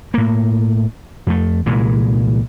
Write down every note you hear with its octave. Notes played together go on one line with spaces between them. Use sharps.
A2 A#3
F2 A3
C2 A#2 E3 G#3